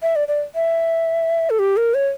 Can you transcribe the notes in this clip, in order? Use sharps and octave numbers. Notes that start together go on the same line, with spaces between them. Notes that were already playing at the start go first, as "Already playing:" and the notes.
E5
D5
D5
E5
A4
G4
A#4
C#5